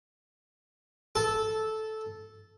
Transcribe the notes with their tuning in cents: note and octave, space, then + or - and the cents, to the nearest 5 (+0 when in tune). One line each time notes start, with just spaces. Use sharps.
A4 -10